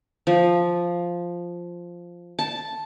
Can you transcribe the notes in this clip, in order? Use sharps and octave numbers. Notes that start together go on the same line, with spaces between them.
F3
A5